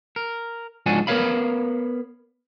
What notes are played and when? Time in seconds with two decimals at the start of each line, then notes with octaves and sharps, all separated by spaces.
0.16 A#4
0.86 C#2 G#2 F3 D4 F#4 G#5
1.07 B3 A#4 B4 C#5 F5 B5